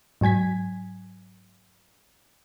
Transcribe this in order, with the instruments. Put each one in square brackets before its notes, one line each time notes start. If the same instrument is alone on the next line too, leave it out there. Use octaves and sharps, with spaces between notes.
[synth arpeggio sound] G#2 F#3 G#5 G#6 B6